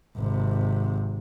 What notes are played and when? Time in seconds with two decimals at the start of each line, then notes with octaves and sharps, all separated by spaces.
0.16 G#1 C3